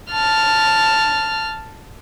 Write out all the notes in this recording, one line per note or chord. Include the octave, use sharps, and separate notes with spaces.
A5 F6